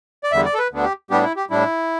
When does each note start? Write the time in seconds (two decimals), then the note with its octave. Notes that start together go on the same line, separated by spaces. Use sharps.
0.24 D5
0.32 E2 D3 G3 E5
0.45 D5
0.54 A4
0.58 B4
0.72 D2 D3 B3 D4
0.84 G4
1.10 A2 G3 B3 D4 G4
1.23 E4
1.36 G4
1.50 A2 G3 D4 E4